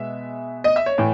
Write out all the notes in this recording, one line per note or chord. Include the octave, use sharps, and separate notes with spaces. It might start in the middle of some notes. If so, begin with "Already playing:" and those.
Already playing: B2 G#3 B3 E5
D#5
E5
C#5
A2 E3